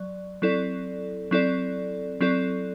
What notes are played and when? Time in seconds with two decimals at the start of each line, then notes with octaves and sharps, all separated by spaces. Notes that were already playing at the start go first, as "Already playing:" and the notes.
Already playing: F#3 D5
0.42 F#3 C4 E4 A4 D5
1.31 F#3 C4 E4 A4 D5
2.21 F#3 C4 E4 A4 D5